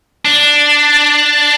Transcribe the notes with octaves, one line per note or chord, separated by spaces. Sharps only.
D4